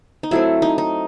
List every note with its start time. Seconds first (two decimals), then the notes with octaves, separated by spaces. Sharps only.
0.23 D#4
0.31 F#3 A3 C4 E4
0.62 D#4
0.78 D#4